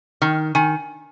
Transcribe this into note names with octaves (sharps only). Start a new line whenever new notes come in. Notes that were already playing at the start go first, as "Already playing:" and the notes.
D#3 F6
D#3 G#5